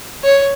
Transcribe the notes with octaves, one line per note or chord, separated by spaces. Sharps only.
C#5